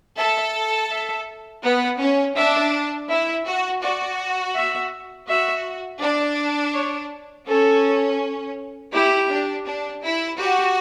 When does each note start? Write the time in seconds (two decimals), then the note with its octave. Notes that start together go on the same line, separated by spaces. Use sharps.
0.17 A4 E5
0.90 E5
1.63 B3 F#5
2.00 C#4
2.36 D4 E5
3.09 E4 E5
3.46 F#4
3.82 F#4 D5
4.56 E5
5.28 F#4 E5
6.01 D4 D5
6.74 C#5
7.47 C#4 A4
8.93 E4 G4
9.30 D4
9.66 D4
10.03 E4
10.39 F#4 G4